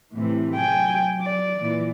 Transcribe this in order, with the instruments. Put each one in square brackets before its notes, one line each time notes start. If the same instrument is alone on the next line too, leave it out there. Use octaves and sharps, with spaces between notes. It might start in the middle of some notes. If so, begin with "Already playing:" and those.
[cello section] A2 C3 E3
[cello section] F#3 [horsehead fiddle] G5 G#5
[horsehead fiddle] D5
[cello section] A#2 E3